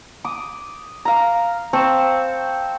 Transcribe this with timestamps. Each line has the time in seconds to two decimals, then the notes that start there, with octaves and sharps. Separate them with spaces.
0.25 D6 D#6
1.05 F5 A#5
1.73 C4 A5 C#6